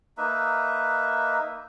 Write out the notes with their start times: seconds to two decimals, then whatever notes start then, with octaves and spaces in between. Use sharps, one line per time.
0.18 A#3 D#4 B4 E5